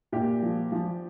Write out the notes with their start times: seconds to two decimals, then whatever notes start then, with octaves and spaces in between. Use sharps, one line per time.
0.12 A#2 G4
0.42 F3
0.72 F3